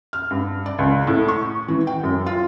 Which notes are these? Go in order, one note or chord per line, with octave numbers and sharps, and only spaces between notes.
F6
G2
D5
C#2
A2
C#6
E3
G5
F#2
F4